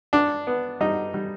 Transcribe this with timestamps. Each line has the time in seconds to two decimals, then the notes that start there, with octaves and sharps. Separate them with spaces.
0.13 D4
0.47 B3
0.80 G3 D#4
1.14 G3